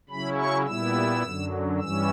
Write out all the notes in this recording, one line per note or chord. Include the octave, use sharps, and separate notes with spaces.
C#3 F#3 C#4 E4 B5
C#6
A#2 G3 B3 E4 E6
F#2 D3 F#3
G2 E3 G3 C#4 E6